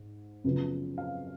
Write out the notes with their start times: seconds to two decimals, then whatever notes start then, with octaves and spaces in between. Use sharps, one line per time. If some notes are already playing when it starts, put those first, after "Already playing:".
Already playing: G#2
0.44 F#2 C#3 F3 B3
0.98 F5